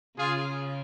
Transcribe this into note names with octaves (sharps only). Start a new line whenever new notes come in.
C#3 F4 G#4